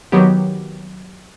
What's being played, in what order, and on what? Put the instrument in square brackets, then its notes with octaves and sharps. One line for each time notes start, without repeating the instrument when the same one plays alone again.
[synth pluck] D#3 F#3 B3 G4